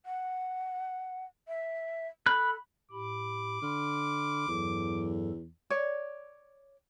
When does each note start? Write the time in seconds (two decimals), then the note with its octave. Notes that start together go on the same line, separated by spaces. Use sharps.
0.06 F#5
1.48 E5
2.26 A4 B5 F#6
2.92 A2 G4 B5 D6
3.62 D3 B5 C6 F6
4.48 E2 G2 F#3 A4
5.70 C#5 D5